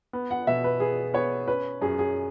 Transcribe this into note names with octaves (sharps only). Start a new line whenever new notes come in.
B3
F#5
B2 E5
B4
B3 G#4
B3 C#5
C#4 B4
F#2 G#4
G#4